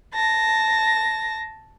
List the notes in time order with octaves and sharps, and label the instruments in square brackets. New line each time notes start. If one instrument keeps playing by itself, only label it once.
[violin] A5 A#6